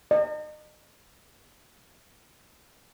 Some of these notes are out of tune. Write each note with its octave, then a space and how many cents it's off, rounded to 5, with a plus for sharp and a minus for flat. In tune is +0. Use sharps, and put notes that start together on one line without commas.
D#5 -35